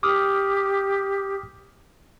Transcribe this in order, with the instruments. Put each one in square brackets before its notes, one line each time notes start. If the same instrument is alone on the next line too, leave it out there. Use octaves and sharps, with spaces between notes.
[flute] G4 [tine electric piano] D6 D#6 F6